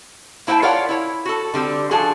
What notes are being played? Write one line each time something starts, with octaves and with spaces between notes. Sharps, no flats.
A#3 E4 C5 F#5 G5 A5
F4 A#4 C#5 D5 F5 F#5
E4 C#5
F#4 A4
D3 G3 C4
F3 D4 F#4 G#4 A4